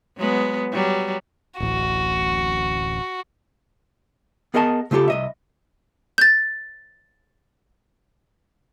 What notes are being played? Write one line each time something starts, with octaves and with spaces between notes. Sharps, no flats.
F#3 G#3 B3
F#3 G3
D1 A1 F#4
B3 G#4 A#4 D#5 F#5 A5
C#3 A3 F4 G4 A4
C2 D#5 E5
G6 A6